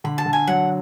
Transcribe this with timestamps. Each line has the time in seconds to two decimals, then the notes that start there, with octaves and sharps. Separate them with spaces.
0.04 D3 B5
0.18 A5
0.26 D3
0.33 G#5
0.47 F#3 F#5